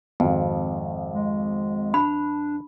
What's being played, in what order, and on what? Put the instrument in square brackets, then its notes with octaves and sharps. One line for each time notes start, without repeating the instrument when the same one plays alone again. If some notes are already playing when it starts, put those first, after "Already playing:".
[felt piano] G#1 [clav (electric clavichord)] F2
[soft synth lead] G#3
[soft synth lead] D4 [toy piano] B5